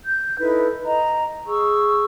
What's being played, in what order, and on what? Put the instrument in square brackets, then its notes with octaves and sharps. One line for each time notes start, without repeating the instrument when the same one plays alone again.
[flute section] G6
D#4 E4 A4 B4
D#5 A#5
G#4 C#6 E6